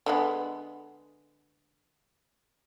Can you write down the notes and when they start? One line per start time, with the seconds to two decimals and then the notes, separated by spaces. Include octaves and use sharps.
0.06 D3 G#3 B3